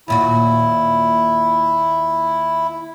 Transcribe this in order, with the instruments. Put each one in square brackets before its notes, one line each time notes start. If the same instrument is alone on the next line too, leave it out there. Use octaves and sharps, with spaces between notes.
[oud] D#2 A#2 F#4 [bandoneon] E4